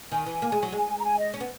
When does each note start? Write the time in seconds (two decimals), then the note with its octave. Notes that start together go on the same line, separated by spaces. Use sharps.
0.12 D#3 G#5
0.26 E3
0.42 A#3
0.52 G#3
0.63 F#3
0.72 G#3
0.99 A#5
1.04 G#5
1.18 D#5
1.34 C#4
1.41 B3